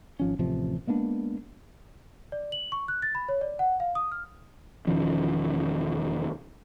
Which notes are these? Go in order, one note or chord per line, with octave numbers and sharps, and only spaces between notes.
G#1 F3 C#4
A1 C3 F3
G#3 A#3 B3 D4
D5
F#7
C#6
F#6
A6
B5
C#5
D5
F#5
F5
D#6
F6
E1 D#3 F3 C#4